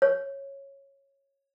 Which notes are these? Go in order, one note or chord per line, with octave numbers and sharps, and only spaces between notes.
C#5